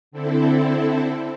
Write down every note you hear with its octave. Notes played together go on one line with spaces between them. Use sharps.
D3 C4 E4 A4